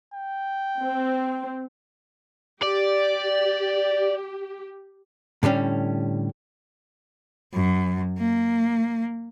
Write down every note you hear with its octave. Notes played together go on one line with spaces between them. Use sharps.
G5
C4
G4 D5
A2 D3 G3 C#4
F#2
A#3